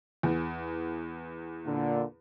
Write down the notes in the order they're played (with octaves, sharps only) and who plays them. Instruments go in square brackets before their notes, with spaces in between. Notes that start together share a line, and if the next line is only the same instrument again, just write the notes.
[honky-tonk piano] E2
[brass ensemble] A#2 D3